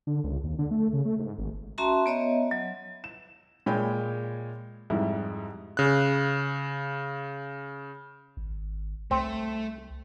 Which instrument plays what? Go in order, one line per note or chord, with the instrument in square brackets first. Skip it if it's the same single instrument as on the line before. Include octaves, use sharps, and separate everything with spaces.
[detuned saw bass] D3
C#2
D#2
D3
A3
C#3
A3
G#2
G#1
[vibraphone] C#4 F#4 E5 A5 A#5 C6
B3 C#5 D#5 E5
F#3
[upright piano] E7
A#2 G#3 C#5 G5 B5 G6
F2 G#2 G3 E4
[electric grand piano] C#3 F#6
[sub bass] G#1
[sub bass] C2 [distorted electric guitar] A3 [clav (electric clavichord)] C4